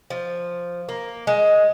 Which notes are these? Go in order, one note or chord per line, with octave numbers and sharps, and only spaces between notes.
F3
A#3
G#3